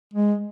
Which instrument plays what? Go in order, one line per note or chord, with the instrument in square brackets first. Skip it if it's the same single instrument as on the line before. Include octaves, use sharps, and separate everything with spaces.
[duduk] G#3